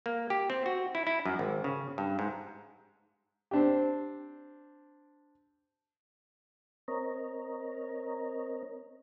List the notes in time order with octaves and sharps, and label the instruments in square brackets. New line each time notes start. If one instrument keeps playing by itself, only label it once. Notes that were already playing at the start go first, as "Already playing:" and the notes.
[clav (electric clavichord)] A#3
G4
C4
F#4
E4
E4
F#2
G#1
C#3
G2
G#2
[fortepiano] C4 D4 G4
[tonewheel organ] C4 A#4 C#5 D#5 A#5